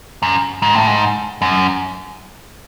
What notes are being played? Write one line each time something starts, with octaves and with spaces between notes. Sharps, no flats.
F#2
G#2
A2
G#2
F#2